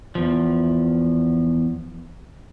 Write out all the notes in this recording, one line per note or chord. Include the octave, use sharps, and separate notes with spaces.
E2 F3